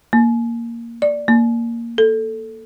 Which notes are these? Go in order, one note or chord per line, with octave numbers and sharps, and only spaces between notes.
A#3
D5
A#3
A4